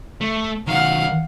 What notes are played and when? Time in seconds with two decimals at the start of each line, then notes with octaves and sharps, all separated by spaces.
0.21 A3
0.67 D#3 F#3 F5 F#5